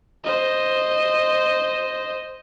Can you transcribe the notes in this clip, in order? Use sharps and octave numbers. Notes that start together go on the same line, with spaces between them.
C5 D#5